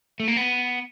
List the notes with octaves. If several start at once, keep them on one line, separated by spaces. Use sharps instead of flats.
A3
A#3
B3